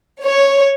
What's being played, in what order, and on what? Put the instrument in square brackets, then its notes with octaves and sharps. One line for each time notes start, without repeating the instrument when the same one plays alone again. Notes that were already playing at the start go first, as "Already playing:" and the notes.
[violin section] C#5